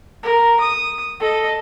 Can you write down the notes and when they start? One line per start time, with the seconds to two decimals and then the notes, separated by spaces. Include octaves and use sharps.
0.23 A#4
0.60 D#6
1.20 A4 D#5